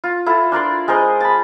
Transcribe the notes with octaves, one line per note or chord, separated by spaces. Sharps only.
F4
E4 F4 A4
D4 A#4 D5 C6
G#3 A#4 C5 D#5
A5 B5